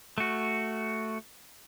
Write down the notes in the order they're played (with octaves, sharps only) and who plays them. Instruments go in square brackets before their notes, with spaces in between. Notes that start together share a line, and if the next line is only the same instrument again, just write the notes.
[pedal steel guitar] A3 F#4